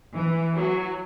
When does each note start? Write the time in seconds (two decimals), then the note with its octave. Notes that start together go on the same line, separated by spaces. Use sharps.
0.15 E3
0.55 F#3